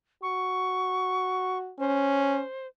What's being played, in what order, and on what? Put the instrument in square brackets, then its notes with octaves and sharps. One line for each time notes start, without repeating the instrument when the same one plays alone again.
[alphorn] F#4 [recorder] C#6
[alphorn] C#4 [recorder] C5